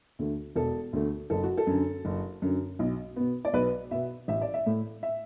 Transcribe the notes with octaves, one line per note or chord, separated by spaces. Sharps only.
D2 D3 A3
E1 A4
D2 D3 A3
F#1 A4
F#4
A4
F#2 D3
F#1
F#2 D3
B1
B2 B3
D5
B1 B4
B2 B3 E5
A1 E5
D5
E5
A2 A3
E5